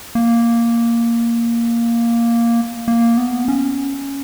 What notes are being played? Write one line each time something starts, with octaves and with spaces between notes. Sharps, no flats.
A#3
A#3
B3
C#4